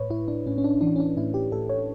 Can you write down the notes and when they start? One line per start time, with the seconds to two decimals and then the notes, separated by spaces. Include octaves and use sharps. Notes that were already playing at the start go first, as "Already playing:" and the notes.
Already playing: A2 B4 C#5
0.10 A2 E4
0.28 D4
0.47 A2 C#4
0.58 C#4
0.64 D4
0.81 E3 D4
0.96 C#4
1.00 D4
1.17 A2 E4
1.34 G4
1.52 A2 A4
1.69 C#5